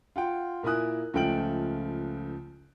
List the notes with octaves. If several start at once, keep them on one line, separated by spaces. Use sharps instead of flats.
F4 F#5 G5
A#2 A#3 E4 G#5 D#6 F#6
C#2 F3 A3 G5 D7 F#7